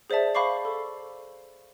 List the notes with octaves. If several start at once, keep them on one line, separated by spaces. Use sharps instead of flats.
G#4 C5 D5 E5 A5
C5 F5 B5 C#6 D6 C7
A4